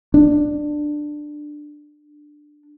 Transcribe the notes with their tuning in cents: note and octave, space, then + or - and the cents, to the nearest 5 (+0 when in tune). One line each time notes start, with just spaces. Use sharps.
D4 +15